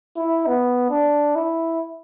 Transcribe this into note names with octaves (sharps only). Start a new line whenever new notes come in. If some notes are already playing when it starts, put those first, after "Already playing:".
E4
B3
D4
E4